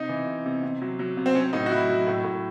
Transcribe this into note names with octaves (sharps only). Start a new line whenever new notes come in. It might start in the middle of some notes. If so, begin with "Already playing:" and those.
Already playing: C3 D#4
E3
C3
C3
C3
F#3
F#3
C3
C4
F#3 C#4
A2 D#4
F#4
F#3 E4
F#3
A2
A2